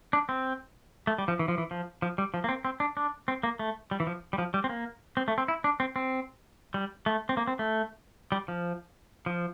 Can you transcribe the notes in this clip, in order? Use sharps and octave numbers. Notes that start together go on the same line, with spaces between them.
D4
C4
A3
G3
F3
E3
F3
E3
F3
F3
G3
F3
A#3
C4
C4
D4
D4
C4
A#3
A3
G3
E3
F3
G3
F3
G3
C4
A#3
C4
A3
C4
E4
D4
C4
C4
G3
A3
C4
A#3
C4
A3
G3
F3
F3